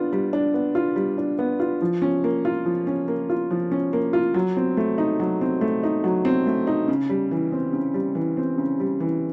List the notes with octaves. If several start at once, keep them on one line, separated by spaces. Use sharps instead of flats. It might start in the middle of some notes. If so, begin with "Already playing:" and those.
Already playing: B3 D4 F4
G3
D4
B3
F4
G3
D4
B3
F4
F3
C#4
A#3
F4
F3
C#4
A#3
F4
F3
C#4
A#3
F4
F#3
C4
A3
D#4
F#3
C4
A3
D#4
F#3
C4
A3
D#4
C#3
G3
E3
C4
C#3
G3
E3
C4
C#3
G3
E3